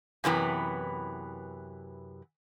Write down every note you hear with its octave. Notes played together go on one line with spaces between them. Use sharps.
F#2 C3 E3 B3